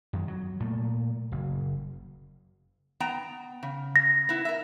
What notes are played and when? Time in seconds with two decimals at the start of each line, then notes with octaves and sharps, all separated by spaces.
0.13 F#2 D#3
0.28 F#3
0.60 A#2 A3
1.32 F#1
3.00 B3 G5 A#5
3.63 C#3
3.96 A#6
4.29 B3 E4
4.45 A#4 E5